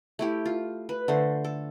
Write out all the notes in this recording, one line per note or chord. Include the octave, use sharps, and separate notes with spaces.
A3 E4 G4
F4
B4
D3 A3 C5
A4